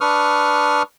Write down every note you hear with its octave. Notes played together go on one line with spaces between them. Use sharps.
D4 B4 C#6 D#6 F6